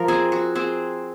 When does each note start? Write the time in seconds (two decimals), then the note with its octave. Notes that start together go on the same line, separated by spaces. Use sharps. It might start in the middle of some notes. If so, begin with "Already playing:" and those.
Already playing: F3 A#4
0.08 C4 G#4
0.32 F#4
0.55 C4 G#4